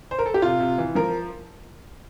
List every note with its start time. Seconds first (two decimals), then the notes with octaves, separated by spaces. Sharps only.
0.11 C5
0.19 A#4
0.26 A4
0.34 G4
0.42 C3 F4
0.60 C3
0.78 E3
0.95 F3 A#4